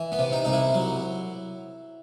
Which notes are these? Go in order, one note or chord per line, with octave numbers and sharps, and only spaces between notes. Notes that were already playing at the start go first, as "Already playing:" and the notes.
Already playing: E3
B3
C3
D#4
C2 D#4
E4
F#3